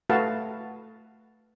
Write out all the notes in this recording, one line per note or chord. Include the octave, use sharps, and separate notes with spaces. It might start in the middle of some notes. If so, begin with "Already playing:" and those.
A3 F#4 B4 F5 A5